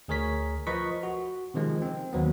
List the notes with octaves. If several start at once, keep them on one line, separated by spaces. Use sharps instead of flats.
D2 G#4 A#4 C#5 B6
F3 A#4 B4 D#5 C#6 B6
F#4
C3 D#3 F3 G#3
C4
D#2 F#3 B3